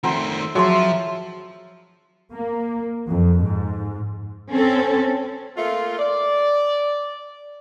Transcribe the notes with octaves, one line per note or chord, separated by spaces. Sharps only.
D#3 A3 C4 F4 F#5 A#5 C6
F3 F#3 F#4 G#4 E5 A5 A#5 C6
A#3
F2
G#2
C4 C#4 A4
A3 A#3 F4
D5